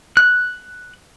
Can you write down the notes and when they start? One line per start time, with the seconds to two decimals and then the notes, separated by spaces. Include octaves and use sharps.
0.17 F#6